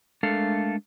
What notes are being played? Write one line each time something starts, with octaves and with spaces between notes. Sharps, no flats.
G#3 A3 D4 A4 A#4 F5